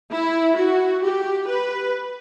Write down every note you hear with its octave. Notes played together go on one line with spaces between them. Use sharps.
E4
F#4
G4
B4